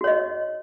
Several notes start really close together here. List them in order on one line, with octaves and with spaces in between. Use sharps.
F#4 C#5 D#5